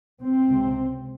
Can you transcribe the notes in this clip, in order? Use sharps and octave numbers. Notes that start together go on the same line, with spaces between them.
C4
C#2 C3